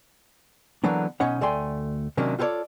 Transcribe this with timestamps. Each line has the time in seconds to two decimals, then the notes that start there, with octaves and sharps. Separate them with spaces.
0.84 D3 E3 F#3 A#3 B3 D4
1.20 B1 B2 C#4 D#4 C#5 F#5
1.41 D2 A3 D5 G5 G#5 C6
2.17 C3 D#3 F#3 A#3 C#4 D4
2.39 F4 G4 A4 B4 C#5 D5